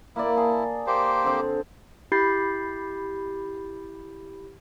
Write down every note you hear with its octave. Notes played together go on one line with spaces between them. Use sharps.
A#3 E4 D5
G#4 A5
A#3 G4 C5
D3 C4
E4 G4 B5 G6 A6 C7